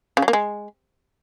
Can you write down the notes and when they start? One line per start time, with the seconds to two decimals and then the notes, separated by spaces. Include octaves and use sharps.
0.17 C#3
0.22 F#3
0.28 A#3
0.33 G#3